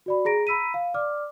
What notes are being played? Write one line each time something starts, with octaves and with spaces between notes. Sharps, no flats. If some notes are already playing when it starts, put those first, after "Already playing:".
F#4 D5 B5
G#4 A#5 A#6 D7
A#5 B5 E6 B6 D#7
F5
D5 D6 F6